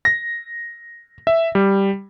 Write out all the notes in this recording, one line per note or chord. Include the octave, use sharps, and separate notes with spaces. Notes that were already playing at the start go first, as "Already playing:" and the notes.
A#6
E5
G3